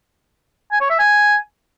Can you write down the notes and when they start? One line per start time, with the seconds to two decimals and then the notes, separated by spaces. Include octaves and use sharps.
0.72 G#5
0.81 C#5
0.90 E5
0.99 G#5